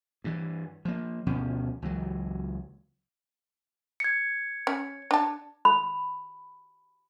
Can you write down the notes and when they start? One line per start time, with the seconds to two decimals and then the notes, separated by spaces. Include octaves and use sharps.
0.24 G2 E3
0.85 F3 A#3
1.26 D2 B2 F3 C#4
1.82 C#2 E3 F#3
4.00 G#6 C#7
4.67 C#4
5.11 D4 A5
5.65 B5